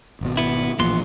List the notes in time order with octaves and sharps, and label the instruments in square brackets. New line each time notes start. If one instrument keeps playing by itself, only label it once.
[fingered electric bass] G#1 B2
[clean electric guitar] B3 E4
[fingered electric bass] A1 A#2 F3 [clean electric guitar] E3 B3 C6